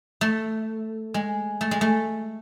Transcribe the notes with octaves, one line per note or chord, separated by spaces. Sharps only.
A3
G#3
A3
G#3
A3